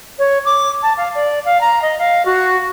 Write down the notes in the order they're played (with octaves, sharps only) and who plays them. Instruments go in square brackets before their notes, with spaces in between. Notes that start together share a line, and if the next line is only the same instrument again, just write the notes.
[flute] C#5
D6
A5
F5
D5
F5
A#5
D#5
F5
F#4